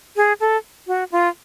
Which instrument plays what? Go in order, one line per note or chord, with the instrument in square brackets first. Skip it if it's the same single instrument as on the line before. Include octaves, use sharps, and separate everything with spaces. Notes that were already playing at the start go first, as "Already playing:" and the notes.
[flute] G#4
A4
F#4
F4